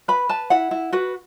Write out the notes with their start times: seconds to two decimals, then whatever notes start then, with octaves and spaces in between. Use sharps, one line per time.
0.08 B4 B5
0.29 B4 A5
0.50 E4 F#5
0.71 E4
0.92 F#4 B4